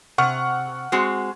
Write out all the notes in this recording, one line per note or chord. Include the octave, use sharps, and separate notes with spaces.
C3 F#5 C#6 F6
G#3 C4 F#4